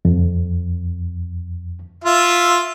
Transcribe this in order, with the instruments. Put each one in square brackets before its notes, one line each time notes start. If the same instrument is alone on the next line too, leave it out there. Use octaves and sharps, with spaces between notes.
[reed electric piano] F2
[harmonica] F4 E5